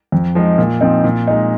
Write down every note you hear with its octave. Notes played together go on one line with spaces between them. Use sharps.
F2
F3 G#3 D#4
A#2
F3 C4 D#4
A#2
G#3 D#4